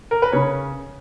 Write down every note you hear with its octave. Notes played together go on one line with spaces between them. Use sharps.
A#4
B4
C#3 C#5